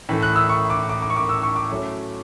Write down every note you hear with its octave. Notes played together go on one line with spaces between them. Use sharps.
A2 E3 A3
F#6
E6
C#6
D6
D6
D6
C#6
D6
E6
C#6
D6
F#3 A3 C#4 E4